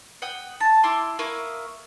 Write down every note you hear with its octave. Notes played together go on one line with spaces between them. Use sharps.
F#5 G5 D#6
A5
E4 C6 D6
A#3 E4 C#6 D#6